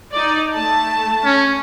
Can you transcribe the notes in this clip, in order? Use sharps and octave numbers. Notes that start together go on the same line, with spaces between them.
D#4 D5
A3 A5
C#4